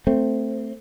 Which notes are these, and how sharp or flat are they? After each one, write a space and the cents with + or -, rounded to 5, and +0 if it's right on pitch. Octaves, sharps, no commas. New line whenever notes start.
A3 +10 C4 +0